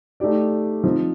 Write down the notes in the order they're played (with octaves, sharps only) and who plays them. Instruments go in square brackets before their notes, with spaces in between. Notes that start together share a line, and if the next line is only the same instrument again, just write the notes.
[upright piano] A3 D#4 G4 D5
F3 C4 D#4